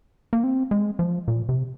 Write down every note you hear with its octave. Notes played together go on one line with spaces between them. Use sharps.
A#3
C4
G#3
F3
A#2
C3